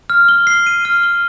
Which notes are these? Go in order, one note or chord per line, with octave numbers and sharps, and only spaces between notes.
F6
G7
C7
D#7
F6
G7